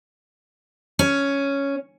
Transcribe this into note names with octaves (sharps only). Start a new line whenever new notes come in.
C#4